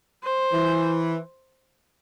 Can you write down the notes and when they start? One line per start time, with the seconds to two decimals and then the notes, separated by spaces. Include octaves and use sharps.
0.24 C5
0.53 E3